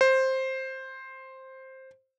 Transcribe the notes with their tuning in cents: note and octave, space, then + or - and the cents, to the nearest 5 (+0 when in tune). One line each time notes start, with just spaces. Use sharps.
C5 +10